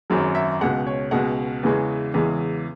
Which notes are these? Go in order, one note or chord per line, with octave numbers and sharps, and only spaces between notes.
G#1 F#2 F#3 G#4
E5
C#2 B2 G#3 F#5
C#5
C#2 B2 G#3 F#5
E2 C#3 E3 G#3
E2 C#3 E3 G#3